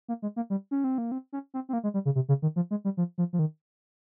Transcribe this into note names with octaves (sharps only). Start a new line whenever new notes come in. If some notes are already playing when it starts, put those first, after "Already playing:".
A#3
G#3
A#3
G3
C#4
C4
A#3
C4
C#4
C4
C4
A#3
G#3
G3
C#3
C3
C#3
D#3
F3
G#3
G3
F3
F3
F3
D#3